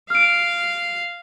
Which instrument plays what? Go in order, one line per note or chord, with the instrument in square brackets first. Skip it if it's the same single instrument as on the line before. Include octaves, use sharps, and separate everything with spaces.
[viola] F5 [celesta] F6 D7